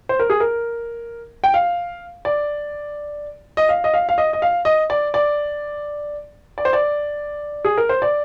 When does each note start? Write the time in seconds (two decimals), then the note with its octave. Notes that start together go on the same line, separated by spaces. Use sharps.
0.09 C5
0.20 A#4
0.30 G#4
0.40 A#4
1.44 G5
1.54 F5
2.25 D5
3.57 D#5
3.69 F5
3.84 D#5
3.94 F5
4.09 F5
4.18 D#5
4.33 D#5
4.42 F5
4.65 D#5
4.90 D5
5.14 D5
6.58 D5
6.65 C5
6.73 D5
7.65 G#4
7.78 A#4
7.89 C5
8.02 D5